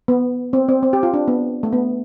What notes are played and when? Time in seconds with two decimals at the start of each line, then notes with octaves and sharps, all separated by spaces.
0.08 B3
0.53 C4
0.68 C4
0.83 C4
0.93 G4
1.03 F4
1.14 D4
1.28 B3
1.63 A3
1.73 B3